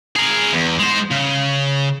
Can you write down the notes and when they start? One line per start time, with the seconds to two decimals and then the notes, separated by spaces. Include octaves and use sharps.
0.16 G#4 A#4
0.53 E2
0.80 G#3 C5
1.12 C#3